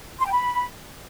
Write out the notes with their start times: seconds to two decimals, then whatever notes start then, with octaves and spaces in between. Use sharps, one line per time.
0.20 C6
0.26 G5
0.32 B5